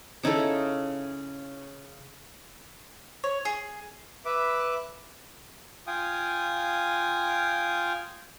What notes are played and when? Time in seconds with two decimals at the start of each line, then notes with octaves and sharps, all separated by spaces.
0.23 C#3 D#4 E4 A4
3.24 C#5
3.45 G#4
4.25 B4 E5 D6
5.87 F4 F5 G5 G#5 D#6